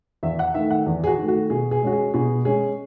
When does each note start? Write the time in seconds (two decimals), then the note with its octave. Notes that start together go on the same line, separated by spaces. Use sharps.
0.23 E2 E5
0.39 F#5
0.54 D#3 A3 E5
0.70 F#5
0.86 E2
1.04 G#4
1.07 F#4
1.18 D#3 A3
1.28 F#4
1.50 B2 G#4
1.71 G#4
1.82 G#3 C#4 F#4
1.92 G#4
2.14 B2 G#4
2.45 G#3 C#4 G#4